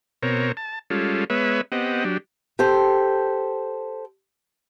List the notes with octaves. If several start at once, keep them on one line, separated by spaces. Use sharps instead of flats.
B2 C4 A#4 C#5
A5
G3 G#3 C#4 F4 A4
G#3 B3 B4 C#5 E5
B3 C4 G4 D#5 F#5
F#3 D4 G4
G4 A4 C5